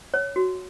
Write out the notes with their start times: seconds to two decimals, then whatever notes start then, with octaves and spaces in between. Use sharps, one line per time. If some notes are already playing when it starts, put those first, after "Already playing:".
0.14 C#5
0.36 F#4